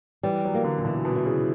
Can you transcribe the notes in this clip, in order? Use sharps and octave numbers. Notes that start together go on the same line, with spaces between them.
E3 G3
F#3
A#3
D3
A#2
B2 E3
B2
E3
C#3